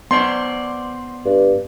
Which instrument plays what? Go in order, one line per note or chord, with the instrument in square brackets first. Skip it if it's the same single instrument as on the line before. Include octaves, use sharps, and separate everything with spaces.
[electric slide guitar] B3 C5 D5 [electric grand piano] C6
[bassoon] G2